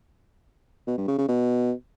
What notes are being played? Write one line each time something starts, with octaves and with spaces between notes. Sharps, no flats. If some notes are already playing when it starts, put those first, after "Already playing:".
B2
G2
C#3
C#3
B2